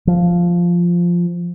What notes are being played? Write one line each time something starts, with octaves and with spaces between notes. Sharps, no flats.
F3